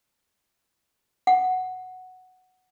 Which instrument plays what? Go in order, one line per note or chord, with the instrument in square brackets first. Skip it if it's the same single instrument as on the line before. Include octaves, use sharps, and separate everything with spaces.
[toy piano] F#5